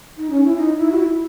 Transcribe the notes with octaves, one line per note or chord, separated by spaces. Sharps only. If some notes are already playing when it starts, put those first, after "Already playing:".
D#4
C#4
E4
D#4
E4
F#4
E4